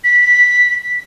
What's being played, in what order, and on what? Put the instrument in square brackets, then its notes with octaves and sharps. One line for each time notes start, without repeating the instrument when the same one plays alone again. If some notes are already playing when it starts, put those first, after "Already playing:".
[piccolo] B6